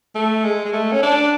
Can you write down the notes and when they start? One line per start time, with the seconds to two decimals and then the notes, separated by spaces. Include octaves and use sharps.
0.15 A3
0.44 G#3
0.65 G#3
0.73 A3
0.92 C#4
1.02 D4